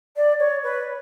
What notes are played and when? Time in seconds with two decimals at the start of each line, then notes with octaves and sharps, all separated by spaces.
0.16 D5
0.39 C#5
0.63 B4